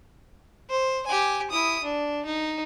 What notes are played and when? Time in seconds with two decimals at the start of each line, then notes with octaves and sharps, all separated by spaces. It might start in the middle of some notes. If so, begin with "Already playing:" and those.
0.70 C5
1.07 G4 G#5
1.50 E4 D#6
1.84 D4
2.25 D#4